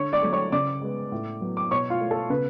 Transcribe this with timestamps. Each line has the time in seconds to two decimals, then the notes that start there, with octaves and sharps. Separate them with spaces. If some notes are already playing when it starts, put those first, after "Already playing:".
Already playing: D3 C#5 C#6
0.13 D5 D6
0.22 F#3 A3
0.33 C#5 C#6
0.52 C#3 D5 D6
0.82 G#3 B3
1.12 A2
1.41 F#3 B3
1.57 D6
1.71 B2 C#5 C#6
1.90 F4 F5
2.00 A3
2.11 A4
2.30 C#3 B3 B4